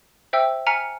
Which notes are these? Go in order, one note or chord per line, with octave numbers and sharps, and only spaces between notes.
C5 E5 G5 E6
G#5 A#5 F6 B6 C#7